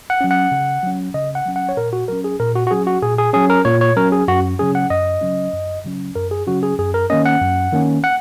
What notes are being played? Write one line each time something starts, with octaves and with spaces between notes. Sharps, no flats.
F#5
F#3 C#4
F#5
C#3
F#3 C#4
C#3 D#5
F#5
F#3 C#4
F#5
C#5
A#2 A#4
F#4
F#3 C#4 A#4
G#4
A#2 A#4
F#4
F#4
F#3 C#4 G#4
F#4
A#2 G#4
G#4
F#3 C#4 G#4
A#4
A#2 C#5
C#5
F#3 C#4 A#4
G#4
F#2 F#4
C#3 F#3 C#4 G#4
F#5
F#2 D#5
C#3 F#3 C#4
F#2
C#3 F#3 C#4
F#2 A#4
G#4
C#3 F#3 C#4 F#4
G#4
F#2 G#4
A#4
D#3 A#3 C#4 D#5
F#5
F#2
D#3 A#3 C#4
F#5